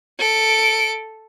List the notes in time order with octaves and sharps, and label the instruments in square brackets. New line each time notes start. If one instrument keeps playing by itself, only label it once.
[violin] A4 D7